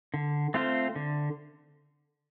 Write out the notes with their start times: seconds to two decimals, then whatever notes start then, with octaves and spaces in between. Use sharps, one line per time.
0.14 D3
0.54 A3 C4 F4 C5
0.96 D3